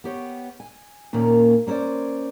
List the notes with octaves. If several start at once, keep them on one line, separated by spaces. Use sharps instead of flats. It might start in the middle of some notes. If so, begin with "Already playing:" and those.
B3 G4 C#5
G#5
D#2 A#2 D#3 A#3 C#4
A#3 C#4 A4 C5 D5